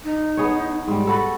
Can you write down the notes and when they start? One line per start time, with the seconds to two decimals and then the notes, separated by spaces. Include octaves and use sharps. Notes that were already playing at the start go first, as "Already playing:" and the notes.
0.04 D#4
0.37 B3 G#4 C#5
0.88 G#2 G3
1.07 F#4 A4 B5